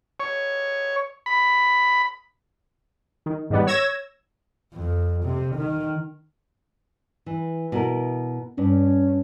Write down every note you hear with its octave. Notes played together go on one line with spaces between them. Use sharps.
C#5
B5
D#3
G#2 D#3 G3 B3
C#5 E6 G#6 A#6 E7
F2
C3
D#3
E3
B2 E4 A#4
G2 C#4